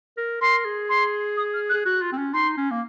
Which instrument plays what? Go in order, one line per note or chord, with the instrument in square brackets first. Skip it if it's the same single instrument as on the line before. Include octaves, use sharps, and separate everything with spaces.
[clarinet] A#4
[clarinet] A#4 [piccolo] C6
[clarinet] G#4
[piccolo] C6
D#6
F6
F#6
[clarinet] G#4
[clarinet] F#4 [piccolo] F#6
[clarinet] F4
C4
C#4
[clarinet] D#4 [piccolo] C6
[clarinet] C#4
A#3